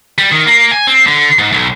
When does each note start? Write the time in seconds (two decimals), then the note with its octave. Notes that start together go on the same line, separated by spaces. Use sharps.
0.18 G3
0.32 D#3
0.46 A#3
0.71 G#5
0.87 C4
1.07 D3
1.39 G#2
1.52 B1